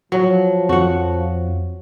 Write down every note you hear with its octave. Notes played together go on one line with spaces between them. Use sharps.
F3 F#3
F2 F#4 F#5